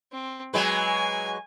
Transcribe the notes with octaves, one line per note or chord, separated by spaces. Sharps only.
C4
F#3 G#3 B4 G#5